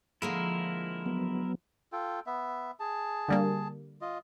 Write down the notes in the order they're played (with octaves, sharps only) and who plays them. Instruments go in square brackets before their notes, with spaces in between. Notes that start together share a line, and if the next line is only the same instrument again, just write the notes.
[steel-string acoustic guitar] D3 G#3 A#3 [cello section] F3 [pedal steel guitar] E4 A#4
[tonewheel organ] F#3 B3
[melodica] F4 A4 G5
B3 E5
G#4 A5
[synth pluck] D3 G3 A#3
[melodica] F4 D#5